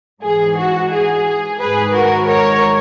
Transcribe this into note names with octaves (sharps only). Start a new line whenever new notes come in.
G#2 E3 G#4
F#4
G#4
G#2 D#3 G#4 B4
F#4 A#4
A#4 C#5